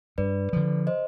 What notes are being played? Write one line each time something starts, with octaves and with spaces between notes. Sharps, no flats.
G2 B4 D5
D3 F3
C5 D#5